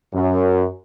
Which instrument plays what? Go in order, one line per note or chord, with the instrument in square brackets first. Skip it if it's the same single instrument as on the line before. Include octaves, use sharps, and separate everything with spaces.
[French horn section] F#2